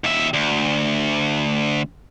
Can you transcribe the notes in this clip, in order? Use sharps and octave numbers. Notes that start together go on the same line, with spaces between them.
D#2 E5
D2